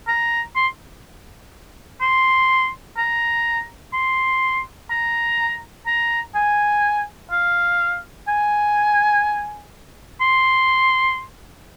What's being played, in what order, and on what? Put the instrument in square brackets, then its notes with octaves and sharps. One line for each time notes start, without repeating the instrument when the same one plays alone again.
[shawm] A#5
C6
C6
A#5
C6
A#5
A#5
G#5
F5
G#5
C6